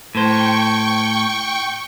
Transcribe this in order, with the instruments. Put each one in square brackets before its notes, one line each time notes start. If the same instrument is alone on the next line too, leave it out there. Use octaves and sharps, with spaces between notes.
[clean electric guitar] A2 C5 [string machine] G5 C#6